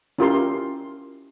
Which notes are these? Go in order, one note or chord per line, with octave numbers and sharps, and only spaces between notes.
C#4 E4 F4 G4 A#4 C6